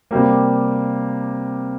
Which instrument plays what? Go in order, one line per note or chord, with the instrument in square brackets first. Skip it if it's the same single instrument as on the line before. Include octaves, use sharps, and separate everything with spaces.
[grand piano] C3 G3 A#3